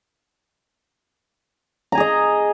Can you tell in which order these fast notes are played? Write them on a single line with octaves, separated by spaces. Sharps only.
A#5 G#5 G#4 D#5